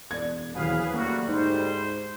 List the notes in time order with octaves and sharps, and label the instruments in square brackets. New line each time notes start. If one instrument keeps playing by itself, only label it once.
[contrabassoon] E1 [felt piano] D5 G#6
[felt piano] D#1 E2 [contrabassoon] F#3 [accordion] G#4 B4 [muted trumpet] F5
[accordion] D2 G3 [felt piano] A#3 [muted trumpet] F#4
[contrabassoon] G#2 [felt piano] D#4 [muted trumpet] C5